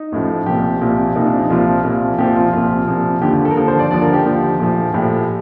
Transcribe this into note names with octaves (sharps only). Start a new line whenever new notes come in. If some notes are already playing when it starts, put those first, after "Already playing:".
Already playing: D#4
A1 A2 F3
C2 A#2 F3 G4
C2 A#2 F3
C2 A#2 F3 D#4
D4
D#4
C2 A#2 F3 F4
C2 A#2 F3
C2 A#2 F3 G4
F4
C2 A#2 F3 F4
C2 A#2 F3
D#2 D3 F3 G4
G4
A4
A#4
D#2 D3 F3 A4
C5
D5
D#2 D3 F3 D5
A#4
G4
D#2 D3 F3
A#1 A2 F3
A#1 A2 F3 G4